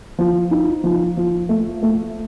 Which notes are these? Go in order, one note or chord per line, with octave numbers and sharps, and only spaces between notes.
F3
D#4
F3
F3
A3
A3